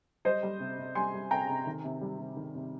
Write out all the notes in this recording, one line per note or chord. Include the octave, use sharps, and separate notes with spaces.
G3 C5 D#5
G3
C3
C3
G3 G#5 C6
G3
C3 G5 A#5
C3
D#3
C3
G3
C3
D#3
C3